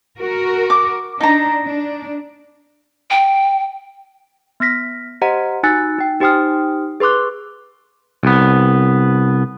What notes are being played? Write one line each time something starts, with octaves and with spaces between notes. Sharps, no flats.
F#4 A#4
D6
D4 D#4 A#5
D4
G5
B3 F6 A#6 B6
G4 C5 D#5 F#5 A#5
D#4 F#4 G#5 E6 F#6 A6
D#4 G5
D#4 G4 C5 G5 D#6 F6
G#4 B4 C6 D6 F#6
C2 B3